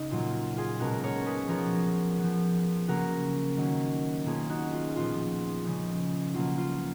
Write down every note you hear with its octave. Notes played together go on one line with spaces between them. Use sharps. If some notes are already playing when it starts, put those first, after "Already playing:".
Already playing: C#3 D#4
A#2 F#3 A#3 F4
F4 G#4
B2 G#3 C#4 F#4 A#4
A#4 C#5
G#4 B4
F3 B3 A#4 C#5
F3 B3
C#3 F#3 A#3 C#4 F#4 A#4
D#3 F#3 A#3 C#4
B2 A#3 C#4 F4 G#4
D#4 F#4
F4
A#2 F3 B3 F4
C#3 F3 G#3 C#4
B2 F#3 A#3 C#4 F4
F4